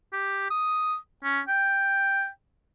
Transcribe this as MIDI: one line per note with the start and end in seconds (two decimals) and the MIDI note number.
0.13 0.46 67
0.51 0.97 87
1.24 1.41 61
1.49 2.28 79